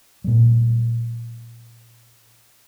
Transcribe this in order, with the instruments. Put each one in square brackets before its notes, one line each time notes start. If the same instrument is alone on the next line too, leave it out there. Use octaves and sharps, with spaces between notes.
[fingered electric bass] A#2 G3